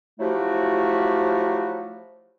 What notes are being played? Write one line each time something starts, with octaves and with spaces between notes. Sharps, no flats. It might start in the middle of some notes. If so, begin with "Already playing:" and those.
F3 F#3 A3 E4 F#4 G4